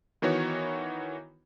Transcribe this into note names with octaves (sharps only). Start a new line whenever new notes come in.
D#3 E3 B3 F#4 C#5